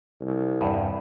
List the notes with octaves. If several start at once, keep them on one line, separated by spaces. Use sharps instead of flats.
C2
E2 G2